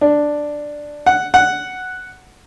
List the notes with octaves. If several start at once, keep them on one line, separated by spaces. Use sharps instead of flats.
D4
F#5
F#5